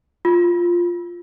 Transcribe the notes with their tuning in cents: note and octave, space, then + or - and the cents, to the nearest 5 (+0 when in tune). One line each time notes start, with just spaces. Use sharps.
F4 +0